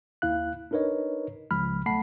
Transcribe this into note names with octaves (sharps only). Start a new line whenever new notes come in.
D#2 E4 F5 F#6
D4 D#4 A#4 B4 C#5 D#5
C#2 F3 B5 F6
B1 A3 F#5 A5 B5 C7